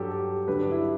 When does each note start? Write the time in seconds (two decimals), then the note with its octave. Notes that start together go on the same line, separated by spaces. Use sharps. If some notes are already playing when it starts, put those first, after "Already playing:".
Already playing: G2 F#3 G4 A4
0.11 G4
0.47 G2 D3 F#3 B4
0.59 D4
0.71 E4